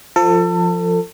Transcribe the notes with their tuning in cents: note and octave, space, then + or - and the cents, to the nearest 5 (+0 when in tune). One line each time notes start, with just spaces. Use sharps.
F3 +0 A4 +30